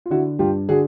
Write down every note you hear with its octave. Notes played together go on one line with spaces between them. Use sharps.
F4
D3 E4 F#4
G2 F4 G4
D3 F#4 G#4